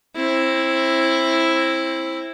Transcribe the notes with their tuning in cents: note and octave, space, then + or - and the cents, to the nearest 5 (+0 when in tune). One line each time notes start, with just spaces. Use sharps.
C4 +25 E4 +0